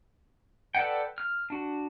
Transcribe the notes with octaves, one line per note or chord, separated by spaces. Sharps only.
A4 B4 D5 F#5 G5
F6
D4 F#4